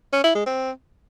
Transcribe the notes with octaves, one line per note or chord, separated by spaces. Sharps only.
C#4
E4
G#3
C4